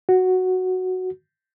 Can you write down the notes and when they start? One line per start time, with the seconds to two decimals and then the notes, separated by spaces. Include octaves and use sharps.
0.09 F#4